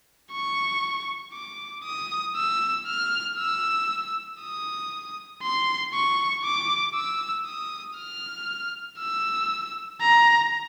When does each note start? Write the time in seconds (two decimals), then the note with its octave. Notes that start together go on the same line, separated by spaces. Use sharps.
0.32 C#6
1.33 D6
1.85 D#6
2.36 E6
2.87 F6
3.38 E6
4.40 D#6
5.42 C6
5.93 C#6
6.44 D6
6.95 E6
7.46 D#6
7.97 F6
8.99 E6
10.01 A#5